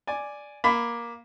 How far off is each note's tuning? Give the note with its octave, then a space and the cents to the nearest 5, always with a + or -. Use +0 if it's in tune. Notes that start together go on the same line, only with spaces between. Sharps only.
D5 +0 G#5 +0
A#3 +10 B5 +15